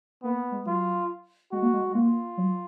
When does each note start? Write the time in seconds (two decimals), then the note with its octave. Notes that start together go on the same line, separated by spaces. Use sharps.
0.23 A#3 B3
0.52 G#3
0.66 F#3 F4
1.52 G#3 F#4
1.62 A#3
1.73 G#3
1.84 G#3
1.95 A#3 F4
2.37 F#3